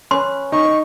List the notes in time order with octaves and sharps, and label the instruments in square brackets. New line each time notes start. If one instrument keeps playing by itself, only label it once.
[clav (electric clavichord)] C#4 B4 [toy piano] C6
[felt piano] D#4 [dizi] C#6